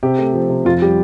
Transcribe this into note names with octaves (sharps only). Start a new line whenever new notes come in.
C3 G4
A3
F3
C3
F2 F4
G3 G4